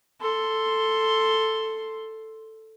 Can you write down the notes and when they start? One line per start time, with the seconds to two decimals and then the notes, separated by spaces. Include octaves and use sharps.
0.20 A4 C6